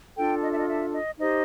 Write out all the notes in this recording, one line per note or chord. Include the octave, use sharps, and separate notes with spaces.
D4 F4 A4 G5
D#5
E5
D#5
E5
D#5
D#4 G4 C5 D#5